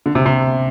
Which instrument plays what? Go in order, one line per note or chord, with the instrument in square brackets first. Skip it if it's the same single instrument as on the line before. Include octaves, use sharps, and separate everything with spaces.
[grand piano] D3
C3
C3